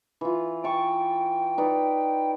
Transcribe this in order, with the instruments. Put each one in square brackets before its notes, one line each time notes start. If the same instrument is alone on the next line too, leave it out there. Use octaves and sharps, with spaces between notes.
[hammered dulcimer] E3 F4
[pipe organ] G5 [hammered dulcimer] A5 C#6
[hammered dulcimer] D#4 B4 D5